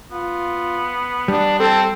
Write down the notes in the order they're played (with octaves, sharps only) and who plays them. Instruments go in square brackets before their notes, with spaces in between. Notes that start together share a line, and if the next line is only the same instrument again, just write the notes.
[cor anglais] B3 [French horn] F4
[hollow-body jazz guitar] G3 [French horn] D4
[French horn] C4 [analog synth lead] A4